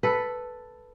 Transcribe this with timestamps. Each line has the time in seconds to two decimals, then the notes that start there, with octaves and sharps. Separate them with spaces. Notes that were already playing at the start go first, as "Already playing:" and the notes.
0.03 A4 B4